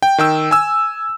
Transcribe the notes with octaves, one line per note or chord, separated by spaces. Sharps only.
G5
D#3 G5 E6
G#5 E6